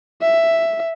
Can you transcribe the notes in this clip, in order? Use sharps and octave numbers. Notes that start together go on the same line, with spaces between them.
E5